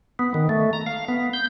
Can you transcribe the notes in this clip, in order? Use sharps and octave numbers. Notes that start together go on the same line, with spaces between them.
B3
D#3
A3
A#5
F5
B3
G6